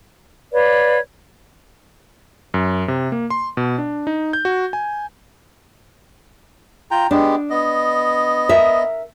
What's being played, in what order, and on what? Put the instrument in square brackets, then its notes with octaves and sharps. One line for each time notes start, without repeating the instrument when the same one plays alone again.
[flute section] B4 C#5 D5 F5
[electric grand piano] F#2
C3
A#3
C6
B2
D4
D#4
G6
F#4
G#5
[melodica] F4 G5 A#5
[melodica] G#3 B3 G4 [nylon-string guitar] D4
[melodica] B3 D#5
[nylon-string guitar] A#4 E5